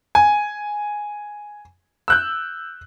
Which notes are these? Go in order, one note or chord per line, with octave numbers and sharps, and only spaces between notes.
G#5
E6 F#6 G6